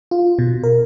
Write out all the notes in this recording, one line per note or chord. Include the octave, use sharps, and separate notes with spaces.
F4
B2
A#4